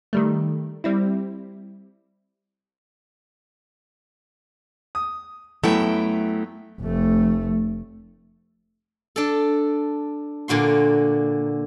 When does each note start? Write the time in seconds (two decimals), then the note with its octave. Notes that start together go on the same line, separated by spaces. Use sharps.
0.13 D#3 G3 A3
0.84 G3 C4 E4
4.95 D#6
5.64 F#2 A3 B3 E4 G5
6.81 F1 A3
9.16 D4 A4
10.48 A#2 D3 F#4 C6